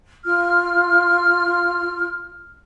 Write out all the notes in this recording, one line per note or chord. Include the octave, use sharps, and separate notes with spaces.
F4 F6